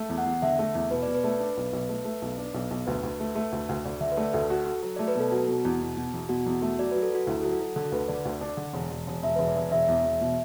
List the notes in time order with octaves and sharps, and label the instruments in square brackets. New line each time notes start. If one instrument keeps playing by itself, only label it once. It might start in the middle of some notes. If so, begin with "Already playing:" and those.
Already playing: [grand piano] A3
E2
[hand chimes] F#5
[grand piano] E2
[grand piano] D3 [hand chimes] E5
[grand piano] A3
E2
[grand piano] B2 [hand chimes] B4
[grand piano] B2 [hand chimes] D5
[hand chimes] B4
[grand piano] A3
D4
B1
B1
A3
A3
B1
D4
B1
B1
[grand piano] D2 [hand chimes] B4
[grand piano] D2
A3
A3
D2
D2
[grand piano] D2 [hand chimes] D5
[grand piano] D3 [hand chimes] E5
[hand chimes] B4
[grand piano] A3 [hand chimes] D5
[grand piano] D2 [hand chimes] A4
[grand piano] F#4
F#4
F#3
[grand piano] A3 [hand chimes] D5
[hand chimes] B4
[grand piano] B2 [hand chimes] A4
[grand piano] F#3 [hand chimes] F#4
[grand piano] B2
E2
B2
B2
E2
[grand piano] B2 [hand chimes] F#4
[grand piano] E2
A3
[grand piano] F#3 [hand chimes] D5
[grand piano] F#3 [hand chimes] B4
[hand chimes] A4
[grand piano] F#3 [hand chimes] F#4
[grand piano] D2 [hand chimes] E4
[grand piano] F#3 [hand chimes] A4
[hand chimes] F#4
[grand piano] F#3
[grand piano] D3 [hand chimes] A4
[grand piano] D2 [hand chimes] B4
[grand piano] D3 [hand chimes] D5
[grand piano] D2
D4
D3
E1
E1
E1
[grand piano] E1 [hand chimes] E5
[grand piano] E1 [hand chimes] B4
[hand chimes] D5
[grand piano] E1
[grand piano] E1 [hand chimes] E5
[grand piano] E2
E1
B2